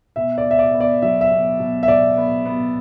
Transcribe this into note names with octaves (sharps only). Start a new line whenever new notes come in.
B2 E5
D5
B2
E5
D5
B3
D5
F#3 E5
E5
B2
B2
E5
B2 D5
B3
B3